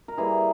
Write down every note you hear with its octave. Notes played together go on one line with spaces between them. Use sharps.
A#4
E3 G3 A#3 G#4